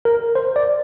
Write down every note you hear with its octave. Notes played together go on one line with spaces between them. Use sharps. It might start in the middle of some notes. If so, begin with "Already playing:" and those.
A#4
C5
D5